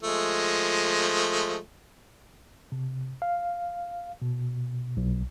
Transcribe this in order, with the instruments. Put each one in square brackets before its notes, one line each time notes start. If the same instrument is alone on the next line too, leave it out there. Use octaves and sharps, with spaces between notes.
[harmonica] F3 G#3 A3
[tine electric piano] C3
F5
B2
B1